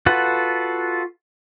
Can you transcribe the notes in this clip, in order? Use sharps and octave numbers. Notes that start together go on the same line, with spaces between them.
F4 F#4 A4 B4 F#5